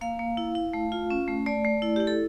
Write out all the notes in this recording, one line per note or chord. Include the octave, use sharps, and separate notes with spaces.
A#3 F5
A#3
E4
E4
A3
F4
C#4
A3
A3 D5
A3
E4
E4 G4
A4